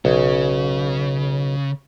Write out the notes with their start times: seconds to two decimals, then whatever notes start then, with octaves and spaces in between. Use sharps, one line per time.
0.05 B1 C#3